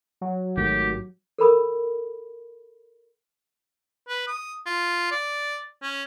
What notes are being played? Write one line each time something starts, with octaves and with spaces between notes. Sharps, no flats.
F#3
G#1 D#3 A3 G4
A4 A#4 B5 D#6
B4
D#6
F4
D5
C#4